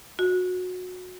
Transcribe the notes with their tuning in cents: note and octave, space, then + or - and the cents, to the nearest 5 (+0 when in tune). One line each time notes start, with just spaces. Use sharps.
F#4 -25